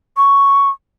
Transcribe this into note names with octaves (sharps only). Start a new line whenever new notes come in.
C#6